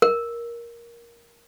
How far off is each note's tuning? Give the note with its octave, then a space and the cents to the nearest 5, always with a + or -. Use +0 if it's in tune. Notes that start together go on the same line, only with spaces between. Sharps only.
A#4 +10